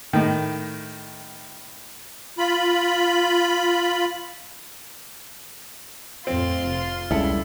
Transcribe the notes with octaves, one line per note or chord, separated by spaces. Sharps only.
A2 D#3
F4 B5
F2 A2 C4 F4 C6
F1
C#2 C#3 G3 E4 A4